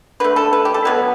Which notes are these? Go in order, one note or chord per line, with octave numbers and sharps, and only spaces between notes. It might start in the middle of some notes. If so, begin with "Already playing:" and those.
D3 A3 B4
A4
B4
G4
A4
B2 F#3 B3 B4